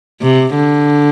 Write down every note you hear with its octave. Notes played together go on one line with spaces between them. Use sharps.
C3
D3